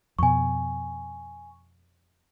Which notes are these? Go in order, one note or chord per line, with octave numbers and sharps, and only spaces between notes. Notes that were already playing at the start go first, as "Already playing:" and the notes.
F2 B2 G#5 C#6